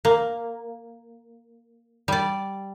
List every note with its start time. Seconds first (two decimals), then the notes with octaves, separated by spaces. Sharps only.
0.05 A#3
2.08 G3 D5